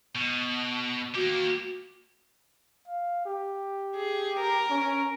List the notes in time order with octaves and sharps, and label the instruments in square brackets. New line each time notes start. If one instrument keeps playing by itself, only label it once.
[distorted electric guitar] B2
[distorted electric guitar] A#3 G4 [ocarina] F#4
[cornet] F5
G4
[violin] G#4
A#4
[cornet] C#4